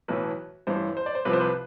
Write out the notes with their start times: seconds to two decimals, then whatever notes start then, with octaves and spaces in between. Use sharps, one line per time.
0.08 B1 A2 E3 B4
0.67 A1 G2 E3 C5
0.97 C5
1.06 D5
1.15 C5
1.25 C2 C3 F3 B4
1.33 C5
1.40 B4